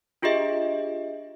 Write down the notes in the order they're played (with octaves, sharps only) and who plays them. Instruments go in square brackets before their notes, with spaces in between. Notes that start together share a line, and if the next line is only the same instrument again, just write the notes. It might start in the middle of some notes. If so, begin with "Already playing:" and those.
[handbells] D4 F4 G4 G#4 D#5 E5